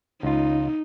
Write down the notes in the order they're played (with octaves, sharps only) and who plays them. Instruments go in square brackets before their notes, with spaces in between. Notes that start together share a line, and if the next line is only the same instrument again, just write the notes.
[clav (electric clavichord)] C#2 F4 [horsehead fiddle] D#4